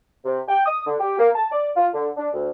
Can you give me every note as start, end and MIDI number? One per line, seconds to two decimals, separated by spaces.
0.25 0.40 48
0.49 0.64 79
0.66 0.83 87
0.87 0.95 50
1.00 1.16 67
1.19 1.29 58
1.35 1.47 81
1.52 1.69 74
1.76 1.87 65
1.94 2.09 50
2.17 2.28 62
2.33 2.50 38